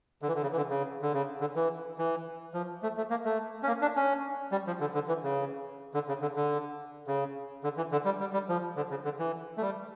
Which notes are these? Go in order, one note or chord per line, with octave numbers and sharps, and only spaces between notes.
D3
E3
D3
C#3
E3
D3
C#3
D3
C#3
D3
E3
E3
F3
A3
A3
A#3
A3
C#4
A#3
D4
C#4
G3
F3
D3
D3
E3
C#3
D3
C#3
D3
D3
C#3
D3
E3
D3
G3
G3
G3
F3
D3
C#3
D3
E3
A3
G3